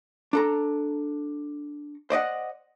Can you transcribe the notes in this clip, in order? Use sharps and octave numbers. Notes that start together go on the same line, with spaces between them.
D4 A4 A#5
C5 D5 D#5 F#5